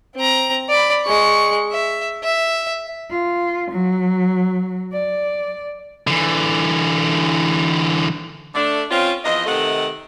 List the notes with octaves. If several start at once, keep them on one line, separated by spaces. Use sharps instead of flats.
C4 A#5
D5 B5
G#3 C#6
E5
E5
F4
F#3
D5
D3 E3
A3 D4
C4 C#4 F4
E2 F3 D#5
C3 D#3 A3 D#5 F#5